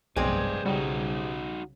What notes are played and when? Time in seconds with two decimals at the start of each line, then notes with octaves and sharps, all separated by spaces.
0.16 F1 B1 G2 G#3 C4 B4 D5
0.66 B1 C#3 G3 D#4 F#4